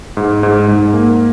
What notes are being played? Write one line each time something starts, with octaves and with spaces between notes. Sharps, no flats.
G#2
G#2
G#2
A#3